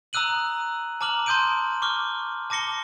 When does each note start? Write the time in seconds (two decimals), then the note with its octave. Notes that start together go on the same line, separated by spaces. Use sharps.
0.13 A#5 D#6 E6 F#6 D#7 F#7
1.01 A5 A#5 D6 F6 F#7
1.26 A5 C6 D#6 G6 D7 D#7
1.82 C#6 D6 F6
2.50 A5 D6 A#6 C#7 G7